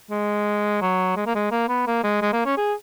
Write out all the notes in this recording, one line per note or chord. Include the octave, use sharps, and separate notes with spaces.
G#3
F#3
G#3
A#3
G#3
A#3
B3
A#3
G#3
G#3
A#3
C#4
G#4